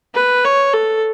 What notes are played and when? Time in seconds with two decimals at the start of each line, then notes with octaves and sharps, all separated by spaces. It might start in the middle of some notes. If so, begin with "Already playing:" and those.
0.15 B4
0.44 C#5
0.73 A4